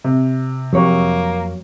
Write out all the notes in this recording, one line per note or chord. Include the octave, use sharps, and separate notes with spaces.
C3
F2 F#3 A#3 G4 C#5